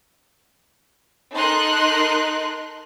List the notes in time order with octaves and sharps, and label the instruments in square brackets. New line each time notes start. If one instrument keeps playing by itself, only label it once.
[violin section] D#4 A4 A#4 C6 F#6